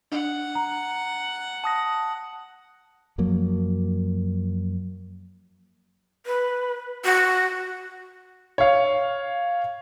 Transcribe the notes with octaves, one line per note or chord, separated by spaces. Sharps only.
D4 F#5
A#5
A5 D#6 A#6
F#2 F3 F#3 A#3
B4
F#4
C#5 F5